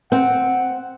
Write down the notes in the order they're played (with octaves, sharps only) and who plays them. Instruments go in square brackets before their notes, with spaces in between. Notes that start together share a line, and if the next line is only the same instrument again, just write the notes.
[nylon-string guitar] C4 [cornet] F#5